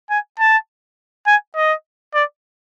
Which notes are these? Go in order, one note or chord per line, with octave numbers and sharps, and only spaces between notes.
G#5
A5
G#5
D#5
D5